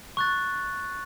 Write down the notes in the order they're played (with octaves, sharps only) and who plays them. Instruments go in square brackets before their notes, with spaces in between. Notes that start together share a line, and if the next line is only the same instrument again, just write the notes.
[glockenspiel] C#6 F#6 A6